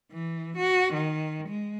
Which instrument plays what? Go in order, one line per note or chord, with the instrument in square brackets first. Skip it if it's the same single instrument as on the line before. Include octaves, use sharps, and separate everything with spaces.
[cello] E3
F#4
D#3
G#3